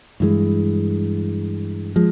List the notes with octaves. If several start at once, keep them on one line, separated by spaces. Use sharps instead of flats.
G2 E3 G#3
F3 G#3